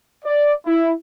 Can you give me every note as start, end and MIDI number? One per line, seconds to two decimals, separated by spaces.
0.24 0.52 74
0.66 0.91 64